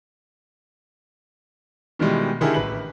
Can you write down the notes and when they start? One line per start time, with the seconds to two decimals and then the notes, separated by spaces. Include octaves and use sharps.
1.99 B2 D#3 E3 G3 G#3
2.41 D3 D#3 E4 G4 G#4 A#4
2.54 A1 B4 F#7